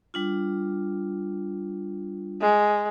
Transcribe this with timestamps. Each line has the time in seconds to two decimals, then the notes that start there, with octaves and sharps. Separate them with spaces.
0.14 G3 D4 F4
2.42 G#3